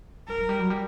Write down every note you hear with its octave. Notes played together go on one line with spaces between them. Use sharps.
F#3 A#4
F#3
G3
F#3
G3